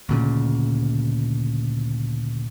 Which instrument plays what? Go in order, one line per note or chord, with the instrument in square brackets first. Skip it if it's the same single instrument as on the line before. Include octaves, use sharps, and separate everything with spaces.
[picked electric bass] D2 A#2 C#3